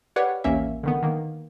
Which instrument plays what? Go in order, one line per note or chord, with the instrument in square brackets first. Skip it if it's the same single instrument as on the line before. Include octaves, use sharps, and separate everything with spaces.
[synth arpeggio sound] G4 B4 C#5 D5 F5 F#5
A1 D#2 A#3 C#4 E5
D3 D#3 B3
D#3 A#3